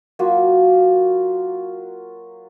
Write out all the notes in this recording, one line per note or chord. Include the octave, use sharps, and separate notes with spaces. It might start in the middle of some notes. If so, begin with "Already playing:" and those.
F#3 A#3 F4 F#4